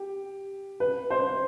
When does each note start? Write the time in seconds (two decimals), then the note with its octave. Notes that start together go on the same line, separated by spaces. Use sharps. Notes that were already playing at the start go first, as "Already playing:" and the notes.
Already playing: G4
0.80 B4
1.10 C5